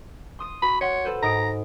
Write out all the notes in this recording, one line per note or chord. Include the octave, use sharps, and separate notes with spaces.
C6 D#6 D#7
F#4 B5
C#5 F#5 C6
A4 B4 C5
G#2 A#5 D#6 D7